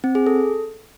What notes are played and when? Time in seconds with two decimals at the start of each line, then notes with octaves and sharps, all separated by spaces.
0.04 C4
0.15 G#4
0.27 A4